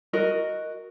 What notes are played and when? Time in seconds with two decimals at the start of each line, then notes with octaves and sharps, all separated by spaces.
0.13 F#4 A#4 D#5